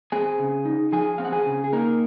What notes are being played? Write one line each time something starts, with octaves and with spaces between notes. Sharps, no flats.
C4 G#4 G#5
C#3
D#4
F3 G#4 G#5
C4 F5
F#5
G#4 G#5
C#3
G#4
A#3 D#4 A#4